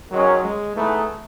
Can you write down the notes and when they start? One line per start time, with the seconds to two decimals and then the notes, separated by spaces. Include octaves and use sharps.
0.11 D#3 F#3 G#3 C#4
0.44 G#3
0.76 E3 A3 B3 D#4 G#4 B4